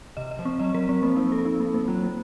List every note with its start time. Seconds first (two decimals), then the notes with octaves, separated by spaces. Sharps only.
0.17 C3 D#5
0.31 D#5
0.39 F3
0.45 C4
0.59 F#3 D#5
0.74 F#3 A#4
0.89 F#3 C4
1.03 F3 A#3
1.17 D#4
1.32 A4
1.45 D#4
1.60 A#3
1.74 A#3
1.88 F#3 F4
2.03 A#3